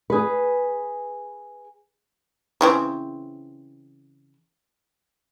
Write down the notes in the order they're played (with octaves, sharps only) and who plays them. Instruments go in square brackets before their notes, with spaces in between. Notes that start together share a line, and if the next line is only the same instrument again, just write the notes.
[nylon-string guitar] G#4 B4
[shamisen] C#3 E3 C4